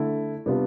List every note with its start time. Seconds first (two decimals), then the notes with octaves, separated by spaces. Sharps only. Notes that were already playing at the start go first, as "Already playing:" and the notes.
Already playing: D3 A3 E4
0.46 C3 G3 B3 D4 F4